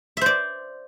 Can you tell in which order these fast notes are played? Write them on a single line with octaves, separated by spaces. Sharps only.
E5 C5 D5